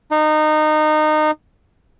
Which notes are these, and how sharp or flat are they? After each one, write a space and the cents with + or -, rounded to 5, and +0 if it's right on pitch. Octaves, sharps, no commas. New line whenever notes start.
D#4 -20